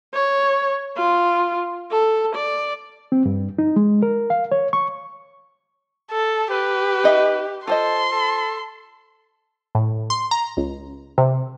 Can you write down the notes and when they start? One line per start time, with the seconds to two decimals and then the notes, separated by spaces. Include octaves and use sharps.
0.14 C#5
0.97 F4
1.92 A4
2.36 D5
3.12 C4
3.26 G2
3.58 D#4
3.76 G#3
4.03 A#4
4.30 F5
4.52 C#5
4.73 C#6
6.11 A4
6.52 G4 B4
7.04 D#4 D#5 E5
7.67 F4 A4 C5 D#5 C6
8.12 A4
9.75 A2
10.10 C6
10.31 A#5
10.57 C#2
11.18 C3